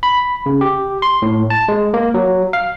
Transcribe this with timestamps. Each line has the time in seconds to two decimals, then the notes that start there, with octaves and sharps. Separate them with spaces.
0.03 B5
0.46 C#3
0.61 G4
1.02 C6
1.22 A2
1.50 A5
1.68 G#3
1.94 A#3
2.14 F#3
2.53 F5